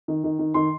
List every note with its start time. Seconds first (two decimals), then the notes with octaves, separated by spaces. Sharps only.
0.08 D#3
0.24 D#3
0.39 D#3
0.54 D#3 C6